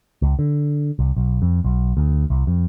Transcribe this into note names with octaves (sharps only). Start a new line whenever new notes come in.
C#2
D3
C2
B1
F2
B1
D2
C2
F2